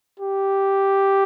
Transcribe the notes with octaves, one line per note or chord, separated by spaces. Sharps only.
G4